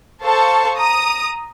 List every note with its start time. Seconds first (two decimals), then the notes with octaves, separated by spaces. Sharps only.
0.22 A4 C5 F5 A5 C#6
0.77 A#5 D#6